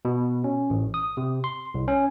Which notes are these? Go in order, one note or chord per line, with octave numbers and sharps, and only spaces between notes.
B2
C#4
A1
D#6
C3
C6
C2
C#4